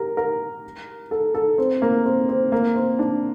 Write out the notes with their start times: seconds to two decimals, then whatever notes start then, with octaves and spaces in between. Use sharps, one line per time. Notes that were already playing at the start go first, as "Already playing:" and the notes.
Already playing: G4 A#4
0.17 A#4
1.11 A4
1.34 A4
1.58 C4
1.82 A#3
2.06 C4
2.29 C4
2.52 A#3
2.76 C4
2.99 D4